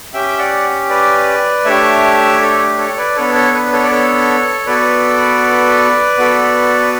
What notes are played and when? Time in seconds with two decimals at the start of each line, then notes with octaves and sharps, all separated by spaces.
0.14 C#4 G4 E5 G5
0.39 D5 F#5
0.89 B4 D5
1.65 A3 D4 G4 C#5 E5
2.41 A4 C#5
2.78 A4 C#5
2.97 B4 D5
3.16 B3 D4 A4 C#5
3.34 A4 C#5
3.54 B4
3.73 A4 C#5
3.83 D5
3.91 A4 C#5
4.66 B3 F#4 A4 B4 D5
6.18 B3 F#4 A4